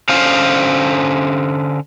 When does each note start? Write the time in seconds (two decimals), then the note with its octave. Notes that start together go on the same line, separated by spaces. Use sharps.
0.09 D3 C#4 C5 F5